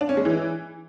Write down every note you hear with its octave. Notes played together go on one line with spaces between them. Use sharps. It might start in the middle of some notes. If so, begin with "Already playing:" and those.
D4
C#4
G#3
E3